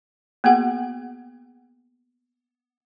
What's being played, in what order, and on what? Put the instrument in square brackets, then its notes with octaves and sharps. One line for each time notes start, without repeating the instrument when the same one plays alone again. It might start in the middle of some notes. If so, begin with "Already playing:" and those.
[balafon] A#3 B3 F#4 G#4 F#5